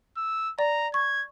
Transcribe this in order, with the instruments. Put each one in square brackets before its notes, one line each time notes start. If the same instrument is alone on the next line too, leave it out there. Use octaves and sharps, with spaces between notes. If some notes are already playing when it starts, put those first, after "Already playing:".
[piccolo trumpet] E6
[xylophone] D5 [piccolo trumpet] A#5
[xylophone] C#6 [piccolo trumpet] G#6